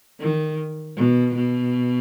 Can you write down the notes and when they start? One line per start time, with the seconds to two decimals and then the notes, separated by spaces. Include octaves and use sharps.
0.20 D#3
0.97 B2
1.35 B2